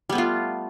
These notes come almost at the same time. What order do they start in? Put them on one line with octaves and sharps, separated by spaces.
G3 B3 A3 F4